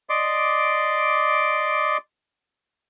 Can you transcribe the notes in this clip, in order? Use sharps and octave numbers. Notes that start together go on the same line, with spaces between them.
D5 D#5 C6 D6